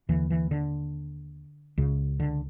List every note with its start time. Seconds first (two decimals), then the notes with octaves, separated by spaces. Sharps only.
0.09 D#2 D3 E3
0.30 E3
0.51 D3
1.78 C#2 C#3
2.20 D3